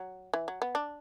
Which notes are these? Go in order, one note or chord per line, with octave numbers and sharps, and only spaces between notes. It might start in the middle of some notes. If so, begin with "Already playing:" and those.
Already playing: F#3
E3
F#3
B3
D4